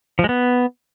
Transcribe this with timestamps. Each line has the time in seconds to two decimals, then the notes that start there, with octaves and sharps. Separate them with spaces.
0.19 F3
0.24 G#3
0.29 B3